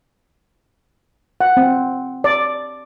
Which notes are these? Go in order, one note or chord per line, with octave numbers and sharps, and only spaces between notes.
F#5
C4
D5